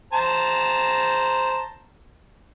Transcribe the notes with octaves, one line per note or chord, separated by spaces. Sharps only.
C5 A5 A#5